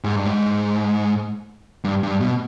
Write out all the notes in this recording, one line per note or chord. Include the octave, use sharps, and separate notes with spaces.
G#2
G2
G#2
G2
G2
B2